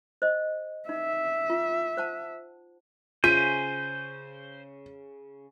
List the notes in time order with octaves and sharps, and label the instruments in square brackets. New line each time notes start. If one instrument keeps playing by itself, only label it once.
[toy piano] C5 D#5
[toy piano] D#4 [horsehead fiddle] E5
[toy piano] F4
C5 F#5 A5
[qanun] C#3 E5 [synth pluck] F4 [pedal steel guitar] C5 [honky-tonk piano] D#7